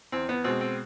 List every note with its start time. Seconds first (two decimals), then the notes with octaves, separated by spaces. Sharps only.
0.12 E2 C4
0.29 B3
0.44 B2 G#3 C4
0.61 C4